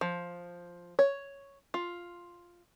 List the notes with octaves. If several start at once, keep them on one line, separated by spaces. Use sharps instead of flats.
F3
C#5
F4